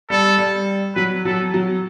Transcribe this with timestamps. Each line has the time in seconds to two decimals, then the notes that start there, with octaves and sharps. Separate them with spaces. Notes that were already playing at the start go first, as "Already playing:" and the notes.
0.10 G3 A4
0.38 G3
0.95 F#3 B4
1.25 F#3 A4
1.54 F#3